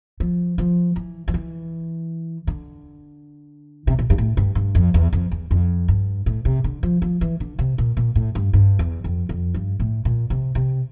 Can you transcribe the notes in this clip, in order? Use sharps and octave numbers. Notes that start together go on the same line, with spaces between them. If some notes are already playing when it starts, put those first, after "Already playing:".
F3
F3
E3
F3
E3
D3
C3
A#2
G2
A2
G2
G2
F2
E2
F2
E2
F2
G2
A2
C3
D3
F3
F3
E3
D3
C3
A#2
A#2
A2
G2
G2
E2
F2
F2
G2
A2
A#2
C3
C3